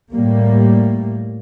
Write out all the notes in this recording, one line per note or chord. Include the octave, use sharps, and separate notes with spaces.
A2 G3 A#3